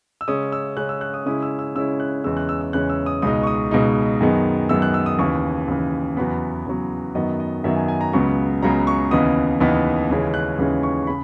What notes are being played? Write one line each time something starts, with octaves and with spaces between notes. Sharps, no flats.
E6
C#3 G#3 C#4 D#6
E6
C#3 G#3 C#4 F#6
E6
F#6
D#6
C#3 G#3 C#4 E4 D#6
E6
E6
C#3 G#3 C#4 E4 E6
F#6
E2 C#3 G#3 C#4 E6
F#6
E6
E6
E2 C#3 G#3 C#4 F#6
E6
D#6
C#2 B2 G#3 D#4 D#6
C#6
D#6
C#2 B2 G#3 D#4
F#2 D#3 G#3 B3
F#2 D#3 G#3 B3 E6
F#6
E6
D#6
D#2 C#3 E3 C#6
D#2 C#3 E3
E2 C#3 F#3 B3 B5
E2 C#3 F#3 B3
F#2 D#3 F#3 B3 D#5
D#5
F#2 D#3 F#3 B3 E5
G#5
G#5
A#5
C#2 C#3 F#3 B3 C#6
C#2 C#3 F#3 B3 A#5
C#6
D#2 C#3 E3 B3 D#4 D#6
D#2 C#3 E3 B3 D#4
D#2 C#3 E3 G#3 C#4
F#6
D#2 C#3 E3 G#3 C#4
C#6
C#6
C#3 B5